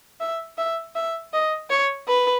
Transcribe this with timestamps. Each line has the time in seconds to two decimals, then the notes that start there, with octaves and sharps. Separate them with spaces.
0.20 E5
0.58 E5
0.95 E5
1.34 D#5
1.70 C#5
2.08 B4